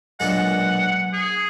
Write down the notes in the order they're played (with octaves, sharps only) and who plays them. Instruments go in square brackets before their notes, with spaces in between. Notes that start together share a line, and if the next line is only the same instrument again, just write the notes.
[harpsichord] B1 A#2 G#3 D4 F4 [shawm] F#5
[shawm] G#4